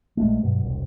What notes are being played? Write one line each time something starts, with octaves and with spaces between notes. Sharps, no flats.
A#1 G2 G#3 A3
G2 B2 F#3
E1 C2